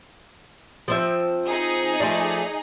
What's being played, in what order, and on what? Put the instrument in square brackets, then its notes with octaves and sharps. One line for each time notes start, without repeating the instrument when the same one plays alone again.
[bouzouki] F3 C4 E5
[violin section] D#4 G#4 D#5
[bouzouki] F3 A3 D5